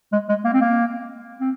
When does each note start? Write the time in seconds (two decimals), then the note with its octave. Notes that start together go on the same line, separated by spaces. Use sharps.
0.13 G#3
0.29 G#3
0.45 A#3
0.54 C4
0.61 A#3
1.41 C4